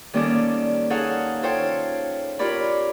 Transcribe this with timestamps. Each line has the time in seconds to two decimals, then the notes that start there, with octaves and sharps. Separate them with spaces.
0.13 D#3 G3 A#3 C#4 A4 D5
0.90 D#4 G#4 A4 C#5 F5 F#5
1.42 F4 A4 C5 C#5 G5
2.39 F4 G4 A#4 C#5 D5 B5